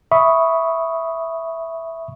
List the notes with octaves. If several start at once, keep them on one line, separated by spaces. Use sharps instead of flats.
E5 B5 C#6 D#6